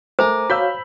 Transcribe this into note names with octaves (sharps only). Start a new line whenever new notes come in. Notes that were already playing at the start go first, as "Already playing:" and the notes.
A3 A#4 C5 G#5 A#5 D6
F#4 C#5 F5 B5 E6 G6 B6